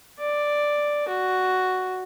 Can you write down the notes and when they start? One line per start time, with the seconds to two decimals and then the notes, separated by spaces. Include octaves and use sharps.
0.20 D5
1.09 F#4